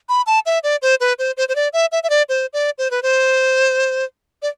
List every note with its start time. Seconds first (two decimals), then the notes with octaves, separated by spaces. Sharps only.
0.09 B5
0.27 A5
0.46 E5
0.63 D5
0.82 C5
1.00 B4
1.19 C5
1.37 C5
1.49 C5
1.56 D5
1.73 E5
1.92 E5
2.03 E5
2.10 D5
2.29 C5
2.53 D5
2.78 C5
2.91 B4
3.03 C5
4.42 D5